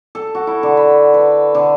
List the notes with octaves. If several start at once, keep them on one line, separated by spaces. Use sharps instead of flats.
A4
F#4
E4
D3
B5
B4
D3